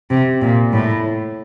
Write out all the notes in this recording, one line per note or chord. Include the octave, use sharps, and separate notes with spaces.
C3
A#2
A2